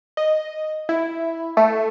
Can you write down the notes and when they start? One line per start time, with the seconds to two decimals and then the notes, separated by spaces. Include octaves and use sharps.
0.17 D#5
0.89 E4
1.57 A3